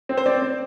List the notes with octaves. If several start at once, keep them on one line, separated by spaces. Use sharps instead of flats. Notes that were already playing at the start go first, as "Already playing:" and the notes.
C4
C5
C4 D5
C4